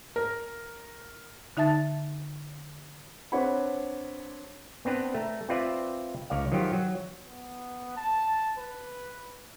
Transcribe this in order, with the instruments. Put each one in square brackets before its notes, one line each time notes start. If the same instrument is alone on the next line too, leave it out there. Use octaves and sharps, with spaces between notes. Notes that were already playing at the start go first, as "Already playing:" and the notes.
[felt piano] A#4
[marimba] D3 D#4 E5 A5 A6
[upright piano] C4 D4 B4 C#5 F#5 B5
[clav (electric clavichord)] B3 C4 D4 B4
A3 A#5
C4 F4 B4 D5 E5
C#2 C#5 D5 F5
D#3 F3 F#3 F4 G4
F#3
[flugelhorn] B3
A5
B4